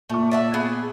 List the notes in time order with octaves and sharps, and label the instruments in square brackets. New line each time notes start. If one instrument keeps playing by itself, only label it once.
[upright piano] A#2 C#6 [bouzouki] A3
[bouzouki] D5 E5 F#5
B3 G#4